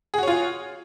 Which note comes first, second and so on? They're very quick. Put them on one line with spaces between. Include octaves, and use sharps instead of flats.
G#4 F#4 C#5 F4